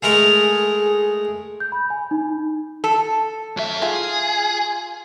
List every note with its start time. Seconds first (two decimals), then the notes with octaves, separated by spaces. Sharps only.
0.03 G#3 A3 G#4 A#4
1.60 G6
1.72 B5
1.90 G#5
2.11 D#4
2.84 A4
3.57 F#2 E5
3.82 F4 G#4